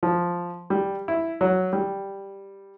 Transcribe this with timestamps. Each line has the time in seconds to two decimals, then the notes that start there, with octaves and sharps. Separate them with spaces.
0.03 F3
0.70 G3
1.08 E4
1.41 F#3
1.73 G3